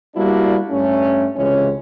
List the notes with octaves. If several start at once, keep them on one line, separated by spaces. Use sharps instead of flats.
G3 A#3 B3 D4 E4 F#4
G2 A3 C#4
C#2 C3 E3 G#3 C#4 C#5